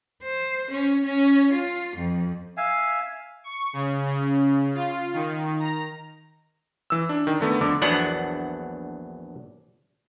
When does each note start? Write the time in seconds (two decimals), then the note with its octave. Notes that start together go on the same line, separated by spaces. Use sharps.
0.22 C5
0.71 C#4
1.05 C#4
1.52 F4
1.96 F2
2.57 E5 F5 G#5
3.44 C#6
3.73 C#3
4.06 C#3
4.75 F4
5.13 D#3
5.59 A#5
6.90 E3 E6
7.09 D4
7.27 D#3
7.41 D3 A3 B3
7.61 F2 D3 D6
7.82 A#1 E2 F#3 B3 D4 F#5